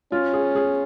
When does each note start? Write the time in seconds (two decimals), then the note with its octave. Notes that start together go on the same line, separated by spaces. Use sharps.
0.12 C#4 F4
0.33 G#4
0.55 G#4